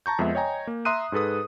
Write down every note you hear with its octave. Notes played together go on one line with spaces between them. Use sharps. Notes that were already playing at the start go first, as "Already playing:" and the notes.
A5 A#5 C#6 G6
F2 G#3 B3 E5
C#5 D#5 G5 G#5 A#5
A#3
E5 A#5 C6 D#6 F#6 D#7
G#2 G#4 A4 B4 D#6